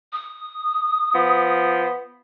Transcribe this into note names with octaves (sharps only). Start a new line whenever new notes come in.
D#6
F3 B3